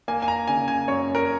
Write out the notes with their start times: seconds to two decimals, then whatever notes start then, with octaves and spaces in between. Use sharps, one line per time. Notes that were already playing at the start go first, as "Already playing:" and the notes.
0.08 A#3 G#5
0.22 G#5
0.28 A#5
0.47 C#3 G#5
0.68 G#5
0.88 F#2 C#5
1.15 A#4